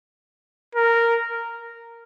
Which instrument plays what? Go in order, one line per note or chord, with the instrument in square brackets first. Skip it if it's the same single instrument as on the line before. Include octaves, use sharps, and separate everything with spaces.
[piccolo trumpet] A#4